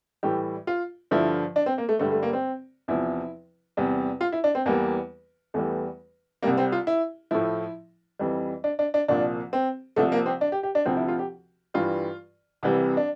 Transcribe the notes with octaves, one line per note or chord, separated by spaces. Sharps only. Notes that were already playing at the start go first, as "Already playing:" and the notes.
A2 E3 G3 G4
F4
G2 D3 F3 E4
D4
C4
A#3
A3
G2 D3 G3 A3
A3
A#3
C4
E2 C3 F3 E4
E2 C3 G3
F4
E4
D4
C4
E2 E3 G3 A#3
E2 E3 G3 A3
C2 C3 G3 A#3
C4
F4
E4
A2 F3 E4
F2 E3 G3
D4
D4
D4
C2 A#2 F3 D4
C4
C2 C3 F3 A3
A#3
C4
D4
G4
G4
D4
D2 C3 F3 C4
E4
F4
G4
G2 E3 G3 F4
C2 C3 E3 G3
D4